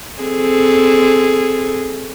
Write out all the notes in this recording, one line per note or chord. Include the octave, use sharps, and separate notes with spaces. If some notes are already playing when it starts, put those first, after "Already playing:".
C4 G#4 A4